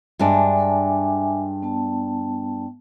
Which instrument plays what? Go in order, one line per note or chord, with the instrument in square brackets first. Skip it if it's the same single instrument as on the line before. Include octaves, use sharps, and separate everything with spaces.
[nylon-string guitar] G2 G#3 D4 [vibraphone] E5 G#5 D6
[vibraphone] B3 A5